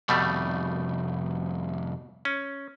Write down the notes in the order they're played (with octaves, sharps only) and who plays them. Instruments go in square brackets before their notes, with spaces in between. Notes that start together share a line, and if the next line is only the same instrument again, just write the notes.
[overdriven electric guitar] C2 F2 [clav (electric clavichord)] B2 G3 A3
[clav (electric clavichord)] C#4